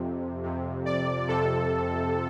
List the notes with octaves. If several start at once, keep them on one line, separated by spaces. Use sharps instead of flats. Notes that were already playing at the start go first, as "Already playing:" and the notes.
Already playing: F2 C3
F2 C3
D5
F2 C3 A4